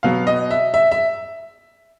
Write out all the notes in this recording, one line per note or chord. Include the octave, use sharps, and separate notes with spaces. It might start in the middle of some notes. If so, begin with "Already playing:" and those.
B2 F#3 B3 F5
D#5
E5
E5
E5